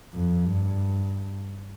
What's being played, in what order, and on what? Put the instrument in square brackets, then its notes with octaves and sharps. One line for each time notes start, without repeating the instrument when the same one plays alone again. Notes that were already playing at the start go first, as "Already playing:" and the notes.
[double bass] F2
G2